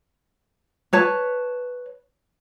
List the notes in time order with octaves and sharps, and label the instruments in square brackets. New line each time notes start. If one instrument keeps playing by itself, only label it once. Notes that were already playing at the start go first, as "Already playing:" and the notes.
[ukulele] B4 C#5 A5